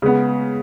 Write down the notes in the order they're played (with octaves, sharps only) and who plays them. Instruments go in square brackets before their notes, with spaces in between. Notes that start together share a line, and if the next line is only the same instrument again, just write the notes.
[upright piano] C#3 G#3 B3